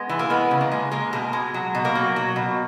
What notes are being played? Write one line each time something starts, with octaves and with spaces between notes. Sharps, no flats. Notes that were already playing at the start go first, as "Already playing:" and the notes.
Already playing: G#3 B3
E3
A#3
G#3 B3
C#3
A#3
G#3
G#3 A#3
B2 A#3
G#3
F#3
B2
A#3
F#3
F#3
B2